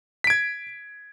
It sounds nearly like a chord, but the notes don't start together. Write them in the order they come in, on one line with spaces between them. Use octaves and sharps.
B6 D7 G#6